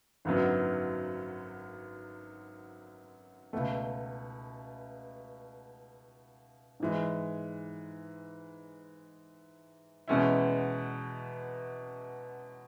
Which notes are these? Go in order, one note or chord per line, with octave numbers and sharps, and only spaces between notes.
G#1 F#2 D3 F#3 B3
C#2 B2 A3
G#2 E3 G#3
E2 B2 G#3 C#4 E4